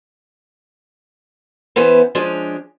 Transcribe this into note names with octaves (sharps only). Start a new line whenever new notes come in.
E3 B3 C#4 C5
F3 G#3 C#4 D4